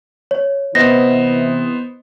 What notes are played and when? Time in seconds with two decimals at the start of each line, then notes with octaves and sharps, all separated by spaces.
0.31 C#5
0.75 C3 E3 B3 E4 C5 D#5 A#6